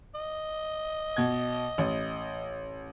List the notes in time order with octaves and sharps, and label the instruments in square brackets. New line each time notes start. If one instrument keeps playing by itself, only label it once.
[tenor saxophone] D#5
[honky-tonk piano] B2 G#6
A1